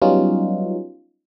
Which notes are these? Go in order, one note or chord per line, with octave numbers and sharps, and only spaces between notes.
F#3 G3 B3 C#4 D#4 F4